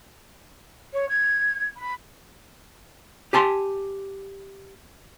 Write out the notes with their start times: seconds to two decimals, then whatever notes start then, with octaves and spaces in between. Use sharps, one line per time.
0.93 C#5
1.09 G#6
1.76 B5
3.33 G4 G#5 A5 C6